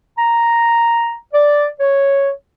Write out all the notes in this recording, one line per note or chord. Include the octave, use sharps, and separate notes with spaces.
A#5
D5
C#5